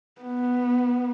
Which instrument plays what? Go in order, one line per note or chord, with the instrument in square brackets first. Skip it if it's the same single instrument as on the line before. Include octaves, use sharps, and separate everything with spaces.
[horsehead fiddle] B3